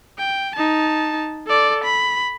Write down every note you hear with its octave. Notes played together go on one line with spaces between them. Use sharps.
G5
D#4 A5
A4 D5
B5